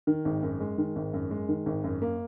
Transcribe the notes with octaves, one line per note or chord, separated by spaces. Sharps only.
D#3
G#1
F#2
G#3
D#3
G#1
F#2
G#3
D#3
G#1
F#2
A#3